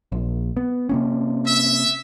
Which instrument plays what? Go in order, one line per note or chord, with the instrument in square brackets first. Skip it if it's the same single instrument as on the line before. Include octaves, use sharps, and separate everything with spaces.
[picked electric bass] A#1
B3
C3 A#3 C#4
[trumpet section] E5